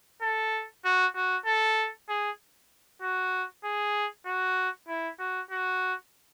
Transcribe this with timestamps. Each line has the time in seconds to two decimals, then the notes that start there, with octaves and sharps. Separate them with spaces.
0.22 A4
0.85 F#4
1.15 F#4
1.46 A4
2.09 G#4
3.02 F#4
3.64 G#4
4.26 F#4
4.88 E4
5.19 F#4
5.51 F#4